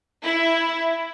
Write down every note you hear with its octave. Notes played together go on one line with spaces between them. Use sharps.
E4